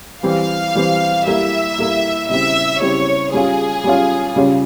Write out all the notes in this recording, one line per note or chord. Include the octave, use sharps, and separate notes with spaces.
E3 G3 C4 F5
E3 G3 C4
G3 A#3 E4 E5
G3 A#3 E4
C#3 G3 C4 E4 E5
C#3 G3 C4 E4 C#5
G3 C#4 F4 G#4
G3 C#4 F4
C#3 G3 C#4 F4